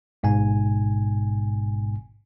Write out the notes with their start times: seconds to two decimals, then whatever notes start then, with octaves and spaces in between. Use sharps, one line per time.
0.23 A1 G#2 B2 G#5